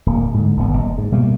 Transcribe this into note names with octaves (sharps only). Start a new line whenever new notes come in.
D1 A#3
G#2 D3
D1 G#1 B3
F#1
G#2
B2 G3 A3 A#3